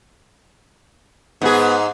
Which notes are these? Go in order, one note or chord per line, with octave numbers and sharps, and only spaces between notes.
G#2 B3 G#4